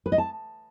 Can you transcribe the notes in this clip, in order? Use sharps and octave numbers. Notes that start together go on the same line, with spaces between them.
B4
D#5
A5